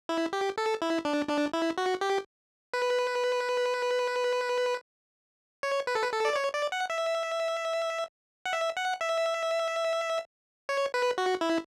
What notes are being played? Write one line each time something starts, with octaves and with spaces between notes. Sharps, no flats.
E4
G4
A4
E4
D4
D4
E4
F#4
G4
B4
C#5
B4
A4
B4
A4
D5
C#5
D5
F#5
E5
F#5
E5
F#5
E5
C#5
B4
F#4
E4